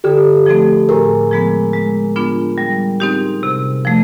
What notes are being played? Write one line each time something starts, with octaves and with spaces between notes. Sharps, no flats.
D3 G4 A4
F3 A3 C4
A2 G#4 A#4
F3 G#3 B3
G#3
B3 D4 F4
G3
C4 D#4 G4
C3
F3 A3